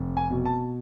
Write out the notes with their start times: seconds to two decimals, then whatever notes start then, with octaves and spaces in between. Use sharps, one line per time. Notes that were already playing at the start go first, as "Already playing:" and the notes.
Already playing: F1
0.17 G#5
0.30 B2
0.45 A5